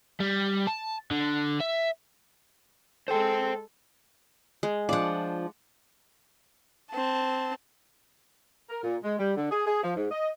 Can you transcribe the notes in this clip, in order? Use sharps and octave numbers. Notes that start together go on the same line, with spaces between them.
G3
A5
D3
E5
G#3 A4 C5 G5
G#3
F3 D4 F4 D5 F#5
C4 A5
A#4
A#2
G#3
G3
D3
G#4
G#4
F3
G#2
D#5